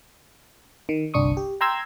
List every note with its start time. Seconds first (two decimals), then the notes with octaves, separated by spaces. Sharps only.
0.89 D#3
1.14 G1 C2 D4 C#6 D#6
1.37 G4
1.61 G5 A#5 C6 E6 G#6